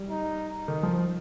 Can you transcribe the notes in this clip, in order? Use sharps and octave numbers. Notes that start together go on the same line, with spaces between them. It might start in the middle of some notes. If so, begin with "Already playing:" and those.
Already playing: G3
D#4
D#3
F3